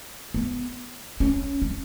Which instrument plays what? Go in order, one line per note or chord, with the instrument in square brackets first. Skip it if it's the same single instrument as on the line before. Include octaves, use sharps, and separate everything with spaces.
[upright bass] B3
C#4
C#4